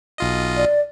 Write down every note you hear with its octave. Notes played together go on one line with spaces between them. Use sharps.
B1 F4 D#5
D5